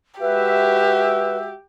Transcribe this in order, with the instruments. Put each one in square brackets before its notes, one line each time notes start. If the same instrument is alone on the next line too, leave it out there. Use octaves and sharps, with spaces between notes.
[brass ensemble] G#3 F#4 E5 [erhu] G4 [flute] B4